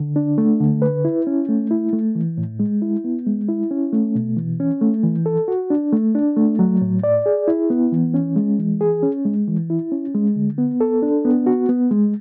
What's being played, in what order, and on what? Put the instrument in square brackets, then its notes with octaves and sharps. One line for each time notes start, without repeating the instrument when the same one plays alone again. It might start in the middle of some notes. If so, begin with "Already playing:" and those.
Already playing: [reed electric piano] D3
D4
A3
D3
B4
E4
C#4
A3
E4
A3
E3
A2
G#3
E4
B3
G#3
E4
C#4
A3
B2
E3
C#4
A3
E3
A4
F#4
D4
A3
D4
A3
F#3
A2
D5
G#4
E4
B3
E3
C#4
G#3
E3
G#4
C#4
G#3
E3
E4
C#4
G#3
D3
B3
A4
D4
B3
F#4
B3
G#3